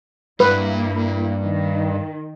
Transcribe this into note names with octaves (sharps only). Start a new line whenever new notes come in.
G2 G3 A#3 E4 B4
D#3